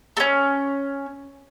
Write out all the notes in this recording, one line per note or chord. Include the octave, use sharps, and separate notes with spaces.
A3 C#4